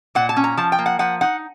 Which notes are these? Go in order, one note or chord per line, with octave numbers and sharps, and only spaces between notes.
A#2 F#5
A5
C#4
A#5
F3 A5
G5
A#3
F#5
F3 F#5
D#4 F#5